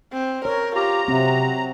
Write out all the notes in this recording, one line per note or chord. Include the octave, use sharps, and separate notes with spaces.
C4
A#4 C#5
F4 G4 A#5
C3 F#3 C4